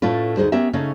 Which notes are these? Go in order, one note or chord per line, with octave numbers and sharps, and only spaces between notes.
A2 A3 C#4 F4 B4
D2 D#4 G#4 C5
B3 C#4 G4 A#4 E5
C#3 A3 C#4 D#4